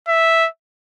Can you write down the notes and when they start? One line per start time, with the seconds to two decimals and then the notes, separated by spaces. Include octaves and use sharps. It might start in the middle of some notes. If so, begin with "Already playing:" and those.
0.08 E5